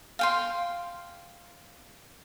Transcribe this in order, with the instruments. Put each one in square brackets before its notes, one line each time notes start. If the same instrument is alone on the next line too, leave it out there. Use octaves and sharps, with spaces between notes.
[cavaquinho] F5 G5 C6